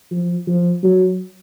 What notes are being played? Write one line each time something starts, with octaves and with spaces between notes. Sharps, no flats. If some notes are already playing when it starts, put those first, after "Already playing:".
F3
F3
F#3